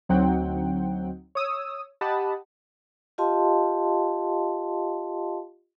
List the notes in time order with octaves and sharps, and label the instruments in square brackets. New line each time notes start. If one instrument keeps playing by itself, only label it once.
[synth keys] D2 F#3 C4 D#4 F#5 G5
C#5 D#6 E6
G4 D#5 F#5 A5 B5 D#6
[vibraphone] F4 G4 D#5 F5 A5 C6